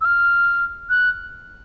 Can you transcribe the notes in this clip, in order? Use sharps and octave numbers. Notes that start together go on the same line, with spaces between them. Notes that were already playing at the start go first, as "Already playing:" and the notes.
E6
F6
F#6